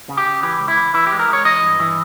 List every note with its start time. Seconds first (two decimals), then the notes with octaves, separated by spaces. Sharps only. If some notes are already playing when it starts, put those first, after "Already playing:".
0.09 C#3
0.17 G4
0.26 C#3
0.43 E3 G4
0.60 C#2
0.68 E4
0.77 E3
0.94 E3 E4
1.07 G4
1.12 G#3
1.19 A#4
1.28 G#3 C#5
1.45 E3 D#5
1.63 G2
1.80 E3